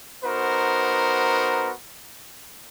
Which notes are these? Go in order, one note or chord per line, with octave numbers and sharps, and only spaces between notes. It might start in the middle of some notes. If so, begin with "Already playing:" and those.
B3 D#4 F#4 A#4 C5